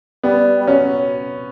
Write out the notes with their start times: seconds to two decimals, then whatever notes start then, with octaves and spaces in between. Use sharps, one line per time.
0.23 G3 B3
0.61 G3
0.67 F#3 C#4